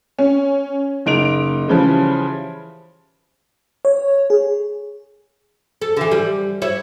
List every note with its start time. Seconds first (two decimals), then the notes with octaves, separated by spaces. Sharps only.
0.19 C#4
1.06 F#1 D#4 D7 F7
1.68 C#3 E3 F3 G3
3.85 C#5
4.30 G#4
5.82 A4
5.97 D3 E3
6.12 G3
6.62 E4 C#5